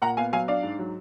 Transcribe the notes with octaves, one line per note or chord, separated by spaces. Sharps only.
A#2 F#5 A#5
B3 F5 G#5
F#3 F5 G#5
D4 D5 F5
G#2
F#3